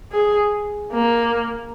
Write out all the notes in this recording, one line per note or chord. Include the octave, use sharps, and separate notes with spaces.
G#4
A#3